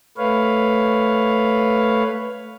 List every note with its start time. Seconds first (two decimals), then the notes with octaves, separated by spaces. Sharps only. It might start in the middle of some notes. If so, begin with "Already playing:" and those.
0.17 A3 B4 C#5 F5